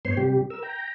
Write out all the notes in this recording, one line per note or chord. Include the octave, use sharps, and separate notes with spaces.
G2 B3 C5 C#5 C6
C3 G3 G4
A#4 E6
G5 A#5